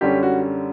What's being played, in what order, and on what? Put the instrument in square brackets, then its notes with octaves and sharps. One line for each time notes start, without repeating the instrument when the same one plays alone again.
[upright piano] F#2 D3 G3 C#4 G4
F#4